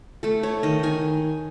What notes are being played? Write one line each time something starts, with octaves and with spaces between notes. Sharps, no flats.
A3 A4
A3 C#5
D#3 D#5
D#3 G#5